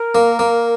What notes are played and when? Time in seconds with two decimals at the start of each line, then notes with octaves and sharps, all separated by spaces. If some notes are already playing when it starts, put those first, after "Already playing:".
Already playing: A#4
0.15 A#3
0.39 A#3